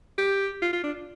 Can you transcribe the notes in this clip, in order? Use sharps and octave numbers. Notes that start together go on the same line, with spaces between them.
G4
F4
F4
D4